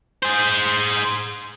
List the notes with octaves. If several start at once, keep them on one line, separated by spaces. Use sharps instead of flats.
G#4 C5